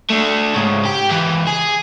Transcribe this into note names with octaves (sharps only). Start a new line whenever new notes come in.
A3 D4
G#2 C#3
G4
C#2 E3
G#4